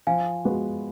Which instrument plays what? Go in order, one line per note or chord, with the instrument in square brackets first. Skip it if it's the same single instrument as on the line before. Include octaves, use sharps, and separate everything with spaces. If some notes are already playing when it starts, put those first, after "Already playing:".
[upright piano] F3 [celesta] F5 G#5
[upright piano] G#3 B3 F#4 B4